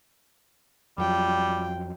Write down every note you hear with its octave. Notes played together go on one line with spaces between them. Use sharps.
F2 F#3 G3 F4 G5